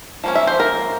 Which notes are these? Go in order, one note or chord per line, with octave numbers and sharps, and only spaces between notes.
F3 A#3 C#4
E5
C5
A#4